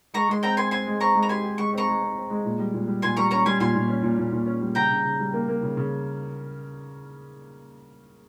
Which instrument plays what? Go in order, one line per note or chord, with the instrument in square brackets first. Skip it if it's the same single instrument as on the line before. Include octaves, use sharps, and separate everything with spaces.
[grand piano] G#3 [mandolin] A#5 C#6
[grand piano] G#3 [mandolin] C6
[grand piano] C4 [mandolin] G5 A#5
[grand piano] C4 [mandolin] G#5 C6
[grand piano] C4 [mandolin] G#5 C6
[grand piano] G#3
[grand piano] C4 [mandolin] A#5 C#6
[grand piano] G#3
[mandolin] A#5
[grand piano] G4 [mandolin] G#5 C6
[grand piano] G4
[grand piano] G#3 [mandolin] C#6
[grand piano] C4 [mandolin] A#5 C#6
[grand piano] G#3
C4
C4
G#3
A#2
G3
A#2
G3
[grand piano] A#2 [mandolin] G#5 C6
[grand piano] G3 [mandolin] A#5 C#6
[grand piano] C#4 [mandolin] A#5 C#6
[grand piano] G3 [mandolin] G#5 C6
[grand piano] A#2 [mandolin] G#5 C6
[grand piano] A#2
C#4
A#2
A#2
A#2
C#4
G3
[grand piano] C#3 [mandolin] G5 A#5
[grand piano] C#3
C#3
G3
A#3
A#3
C#3
C#3